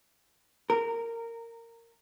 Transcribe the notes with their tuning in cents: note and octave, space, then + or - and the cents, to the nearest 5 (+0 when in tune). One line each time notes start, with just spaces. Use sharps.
A#4 -15